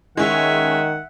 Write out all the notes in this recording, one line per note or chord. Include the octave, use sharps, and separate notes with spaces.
D#3 G#3 C#4 E5 F#5 G#5